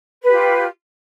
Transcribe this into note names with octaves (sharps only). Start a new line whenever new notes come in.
F4 G4 B4